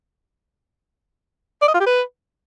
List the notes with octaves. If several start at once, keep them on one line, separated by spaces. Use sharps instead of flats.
D5
D#5
F4
G4
B4